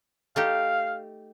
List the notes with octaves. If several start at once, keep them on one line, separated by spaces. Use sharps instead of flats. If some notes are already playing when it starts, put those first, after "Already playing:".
A3 D#4 G4 F5